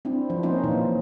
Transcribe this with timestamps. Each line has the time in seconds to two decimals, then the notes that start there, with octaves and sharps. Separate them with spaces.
0.05 C4 D4 E4
0.30 F3
0.43 A#3 C4 C#4 D#4 C5
0.64 A#2 E3